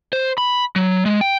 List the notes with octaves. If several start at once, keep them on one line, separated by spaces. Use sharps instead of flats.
C5
B5
F#3
G#3
G5